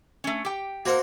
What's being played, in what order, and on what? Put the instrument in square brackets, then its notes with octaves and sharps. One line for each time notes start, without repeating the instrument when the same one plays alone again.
[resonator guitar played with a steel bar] A3 C#4
G4 G5
[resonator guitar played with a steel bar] A#3 A#4 [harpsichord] F#4 C5 F#5